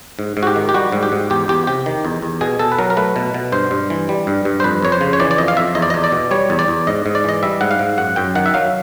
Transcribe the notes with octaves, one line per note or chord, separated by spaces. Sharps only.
G#2
G#2
F#4
G4
D#3
G4
G3 F#4
G#2
G4
G#2
E2 G4
E2 G4
C3 G4
D#3
E2
E2
B2 G#4
B2 A4
B4
F#3 A#4
A#4
A3 B4
B2
B2
G2 C5
G2
E3
G3
G2
G2
C5
F2 B4
F2 C#5
C5
C#3
C#5
E3 D5
D5
F2 D#5
F5
F2 E5
E2 D#5
D5
E2 D#5
D5
B2
G3 C#5
E2
D5
E2
G#2 D#5
G#2
D5
E3 D#5
G3 E5
G#2 F#5
F5
G#2
F#2 F#5
F#2 G5
D#3 F#5
E5
F#3 F5